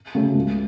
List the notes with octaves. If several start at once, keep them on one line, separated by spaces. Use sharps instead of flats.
C#3 F#3 A3
C#2